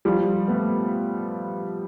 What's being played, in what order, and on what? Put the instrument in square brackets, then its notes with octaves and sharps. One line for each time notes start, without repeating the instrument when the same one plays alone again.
[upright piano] F3 G3
A3 B3